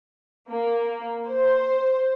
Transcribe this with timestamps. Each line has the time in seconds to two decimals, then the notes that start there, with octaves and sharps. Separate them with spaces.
0.49 A#3
1.28 C5